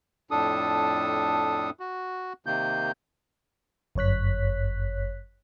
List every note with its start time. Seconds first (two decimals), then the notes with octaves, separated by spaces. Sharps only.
0.31 F2 A2 D4 A4 D#6
1.80 F#4
2.46 C3 D#3 A#3 G6
3.95 G1 F#2 C#5 F#6 B6